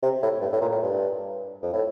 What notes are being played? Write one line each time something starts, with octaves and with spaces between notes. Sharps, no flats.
C3
A2
G2
A2
A#2
A2
G2
F2
A2